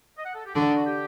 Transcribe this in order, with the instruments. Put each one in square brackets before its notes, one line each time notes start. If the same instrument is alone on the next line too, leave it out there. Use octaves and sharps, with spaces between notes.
[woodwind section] D#5
F#5
A4
G4
[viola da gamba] D3 D4 [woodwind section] F#4
[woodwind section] D#4
F#4
G4